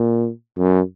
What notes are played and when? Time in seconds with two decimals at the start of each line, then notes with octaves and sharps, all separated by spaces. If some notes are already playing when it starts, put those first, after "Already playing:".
Already playing: A#2
0.58 F#2